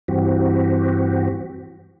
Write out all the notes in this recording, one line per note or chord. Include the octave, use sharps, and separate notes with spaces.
G2 E3 C4 F#4 G4